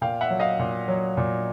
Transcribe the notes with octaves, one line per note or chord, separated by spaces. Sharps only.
A#2 F5 G5
E5 F#5
F#3
D#5 F5
A#2
F#3
A#2